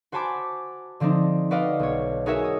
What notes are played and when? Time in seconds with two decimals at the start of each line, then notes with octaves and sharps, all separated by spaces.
0.12 F#4 C5 G#5 A5 B5 D6
1.00 D3 F3 C4 D4 D#4
1.51 F#4 B4 D5 D#5 F5
1.79 B1 C#5
2.26 D#4 F#4 G#4 A#4 C#5 E5
2.44 D#6